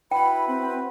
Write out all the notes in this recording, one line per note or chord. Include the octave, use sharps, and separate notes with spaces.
E4 F#4 B4 G5 B5
C4